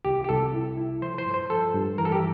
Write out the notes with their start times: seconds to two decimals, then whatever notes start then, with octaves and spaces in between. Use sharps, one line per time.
0.05 C2 G4
0.24 G4
0.29 C2 A4
0.54 E4
0.77 E4
1.02 F3 C5
1.18 C5
1.26 G2
1.34 C5
1.50 F3 A4
1.74 G2
1.98 E3 A#4
2.05 A4
2.12 G4